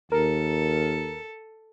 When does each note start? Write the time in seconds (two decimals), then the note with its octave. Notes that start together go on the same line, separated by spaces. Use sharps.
0.12 D#2 A4 A#4